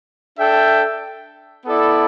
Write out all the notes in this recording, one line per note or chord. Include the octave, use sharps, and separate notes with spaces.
D4 A4 E5 G5
B3 E4 A4 D5